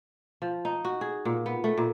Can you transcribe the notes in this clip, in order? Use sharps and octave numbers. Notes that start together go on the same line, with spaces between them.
F3
D#4
F#4
G#4
A#2
B3
A3
A#2